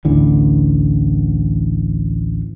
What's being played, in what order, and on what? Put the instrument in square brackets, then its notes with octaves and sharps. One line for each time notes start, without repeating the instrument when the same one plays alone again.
[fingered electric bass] A1 D2 D3 E3